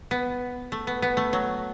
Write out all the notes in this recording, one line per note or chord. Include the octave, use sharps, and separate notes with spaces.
B3
A3
B3
B3
A3
F#3